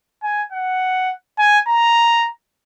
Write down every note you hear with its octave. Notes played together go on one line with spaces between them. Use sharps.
G#5
F#5
G#5
A#5